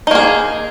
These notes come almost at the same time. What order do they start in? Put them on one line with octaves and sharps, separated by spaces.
D#4 A#3 G#4